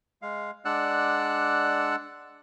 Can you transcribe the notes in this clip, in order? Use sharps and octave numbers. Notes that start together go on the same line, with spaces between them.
G#3 F5
G#3 D4 D5 F#5 E6 F#6